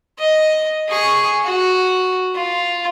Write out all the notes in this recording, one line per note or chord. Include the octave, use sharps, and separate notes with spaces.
D#5
G#4 C#6
F#4
F4